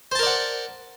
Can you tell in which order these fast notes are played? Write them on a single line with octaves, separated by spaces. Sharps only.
C5 A5 A#4 D5 F#5